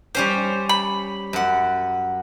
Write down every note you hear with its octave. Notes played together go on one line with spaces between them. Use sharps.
G3 C#4 G4 C5
B5
F#2 F#5